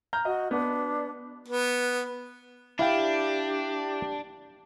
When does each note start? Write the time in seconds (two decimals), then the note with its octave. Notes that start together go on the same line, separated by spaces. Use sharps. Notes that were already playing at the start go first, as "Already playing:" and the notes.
0.13 A#5 F6 G6
0.25 F#4 D#5
0.51 B3 D4
1.48 B3
2.79 D4 E4 G4 F5 G5